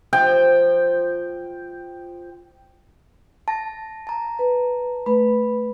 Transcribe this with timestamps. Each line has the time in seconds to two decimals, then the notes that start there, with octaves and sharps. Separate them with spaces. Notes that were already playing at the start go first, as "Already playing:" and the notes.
0.13 F3 G5
3.48 A5 A#6
4.07 A5 A#5
4.39 B4
5.06 A3 B4 B5